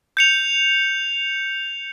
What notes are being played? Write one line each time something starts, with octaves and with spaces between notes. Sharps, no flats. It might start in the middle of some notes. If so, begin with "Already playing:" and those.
G6 C#7 F7